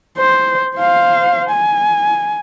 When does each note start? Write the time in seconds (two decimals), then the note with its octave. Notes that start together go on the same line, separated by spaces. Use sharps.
0.18 C5
0.77 C5 F5
1.50 G#5